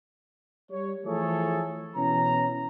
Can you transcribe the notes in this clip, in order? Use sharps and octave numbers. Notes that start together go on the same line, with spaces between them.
G3 C#5
E3 F3 A3 G#4 A4 C#5
B2 E3 C#4 A#5